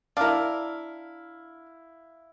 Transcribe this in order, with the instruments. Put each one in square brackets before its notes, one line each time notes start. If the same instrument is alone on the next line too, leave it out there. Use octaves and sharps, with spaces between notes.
[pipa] D4 A#4 [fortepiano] E4 F5